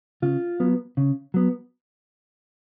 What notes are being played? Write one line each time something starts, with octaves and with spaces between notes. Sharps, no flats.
C#3 F4
F#3 B3
C#3
F#3 B3